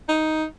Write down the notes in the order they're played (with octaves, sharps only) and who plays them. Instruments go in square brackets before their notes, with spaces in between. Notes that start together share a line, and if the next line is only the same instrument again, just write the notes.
[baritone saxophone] D#4